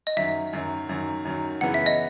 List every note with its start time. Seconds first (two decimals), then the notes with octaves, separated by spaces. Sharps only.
0.07 D#5
0.17 F#2 D#3 F#3 E5
0.53 F#2 D#3 F#3
0.89 F#2 D#3 F#3
1.25 F#2 D#3 F#3
1.61 F#2 C#3 E3 B3 F#5
1.74 E5
1.86 D#5